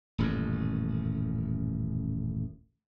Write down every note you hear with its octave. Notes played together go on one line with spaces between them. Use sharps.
D#1 A1 F#2